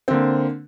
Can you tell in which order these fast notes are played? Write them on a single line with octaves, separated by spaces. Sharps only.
C4 D3 A#3